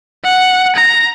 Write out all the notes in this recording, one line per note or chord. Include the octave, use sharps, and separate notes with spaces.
F#5
A#5